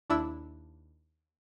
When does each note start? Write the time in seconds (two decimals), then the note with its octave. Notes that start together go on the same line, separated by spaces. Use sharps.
0.10 D#2 D4 E4 E6